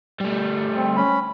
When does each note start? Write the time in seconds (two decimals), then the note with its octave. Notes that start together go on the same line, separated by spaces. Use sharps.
0.20 G3 A3
0.76 C4
0.96 C#4 B5